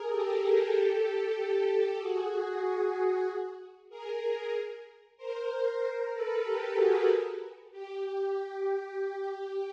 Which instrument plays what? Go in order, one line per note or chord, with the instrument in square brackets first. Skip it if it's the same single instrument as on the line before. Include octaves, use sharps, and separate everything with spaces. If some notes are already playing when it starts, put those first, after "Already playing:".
Already playing: [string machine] G#4 A#4
G4 A4
G#4 A#4
G4 A4
F#4 G#4
F#4 G#4
G#4 A#4
A#4 C5
A#4 C5
A4 B4
G4 A4
F#4 G#4
G4